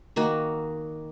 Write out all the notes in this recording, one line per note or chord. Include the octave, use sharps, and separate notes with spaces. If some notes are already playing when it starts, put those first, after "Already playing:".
D#3 A#3 F#4